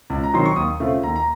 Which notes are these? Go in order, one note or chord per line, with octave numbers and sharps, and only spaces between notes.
C#2
A#5
C3 D#3 F#3 C6
C#6
D#2 D#6
C#3 A3 C4 F4
D#2 A#5
A#5